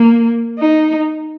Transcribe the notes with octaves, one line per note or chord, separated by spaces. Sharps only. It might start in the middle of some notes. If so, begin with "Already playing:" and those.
Already playing: A#3
D#4